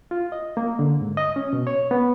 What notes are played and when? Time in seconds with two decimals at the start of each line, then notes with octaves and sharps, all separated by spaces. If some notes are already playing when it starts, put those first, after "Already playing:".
0.11 F4
0.32 D#5
0.57 A#3
0.79 D3
1.01 G#2
1.17 D#5
1.36 C#4
1.53 B2
1.67 C#5
1.91 B3